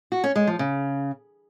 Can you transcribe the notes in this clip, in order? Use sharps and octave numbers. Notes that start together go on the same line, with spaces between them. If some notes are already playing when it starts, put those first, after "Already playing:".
F#4
C#4
G#3
F3
C#3